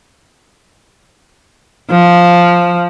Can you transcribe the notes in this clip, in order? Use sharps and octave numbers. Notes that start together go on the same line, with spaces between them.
F3